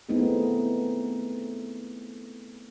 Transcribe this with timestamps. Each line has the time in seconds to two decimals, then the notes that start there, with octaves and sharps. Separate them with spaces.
0.09 A3 B3 C4 D#4 E4 G#4